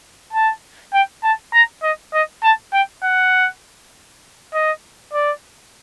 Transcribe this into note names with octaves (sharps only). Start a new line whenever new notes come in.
A5
G5
A5
A#5
D#5
D#5
A5
G5
F#5
D#5
D5